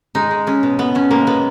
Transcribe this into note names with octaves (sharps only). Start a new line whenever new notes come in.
G#3 D#4
G#3
G#3 C#4
B2
B2 B3
B2 C#4
G#3 A#3
B2 B3